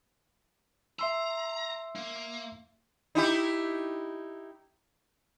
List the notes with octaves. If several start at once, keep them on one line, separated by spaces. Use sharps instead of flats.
E5 A#5 C6 E6
A#3
D#4 E4 G4